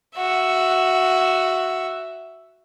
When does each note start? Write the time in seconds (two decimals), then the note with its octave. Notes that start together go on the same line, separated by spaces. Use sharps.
0.17 F#4 E5